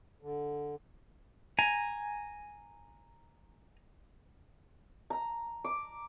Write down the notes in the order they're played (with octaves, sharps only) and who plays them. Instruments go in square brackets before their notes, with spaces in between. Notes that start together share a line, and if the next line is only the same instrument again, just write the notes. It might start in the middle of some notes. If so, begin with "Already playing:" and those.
[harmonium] D3
[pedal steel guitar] G#5 A#5
[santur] A#5
D6